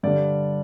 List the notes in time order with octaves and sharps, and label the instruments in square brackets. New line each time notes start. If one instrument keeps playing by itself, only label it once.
[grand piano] G2 D3 G3 D5